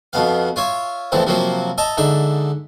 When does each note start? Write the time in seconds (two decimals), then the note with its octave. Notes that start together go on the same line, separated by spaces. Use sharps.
0.13 F2 B2 B3 F5
0.56 F4 C#5 E5
1.12 E2 A2 E3 F3 C4 C5
1.27 C3 F3 F#3 A#3 C4
1.78 D#5 E5 A5 A#5
1.97 G#2 D3 D#4 E5